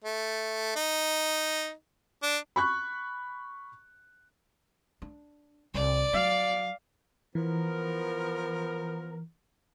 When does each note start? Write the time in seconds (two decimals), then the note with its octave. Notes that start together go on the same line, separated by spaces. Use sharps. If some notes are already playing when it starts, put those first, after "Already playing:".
0.05 A3
0.76 D#4
2.23 D4
2.56 B5 C#6 F#6
5.02 D4
5.74 C2 D5
6.13 F#3 F5
7.35 E3 F3 B3 A#4